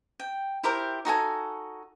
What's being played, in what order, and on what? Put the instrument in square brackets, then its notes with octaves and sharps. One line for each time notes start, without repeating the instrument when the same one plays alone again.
[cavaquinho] G5
E4 G4 A#4 C5
D#4 F#4 A4 G#5